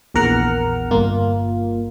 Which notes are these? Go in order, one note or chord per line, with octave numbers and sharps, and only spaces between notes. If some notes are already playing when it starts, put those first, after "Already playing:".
A#1 E2 A#4 F#5 F6
G1 A#3 F4